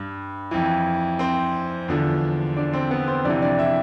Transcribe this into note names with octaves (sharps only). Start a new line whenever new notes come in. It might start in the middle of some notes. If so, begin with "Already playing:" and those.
Already playing: G2
F2 E3
C4 C5
E2 D3 F3
D4 D5
C4 C5
B3 B4
C4 C5
F2 C3 E3 D4 D5
D4 D5
E4 E5